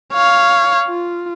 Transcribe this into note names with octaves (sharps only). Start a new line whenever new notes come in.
C#5 F5
F4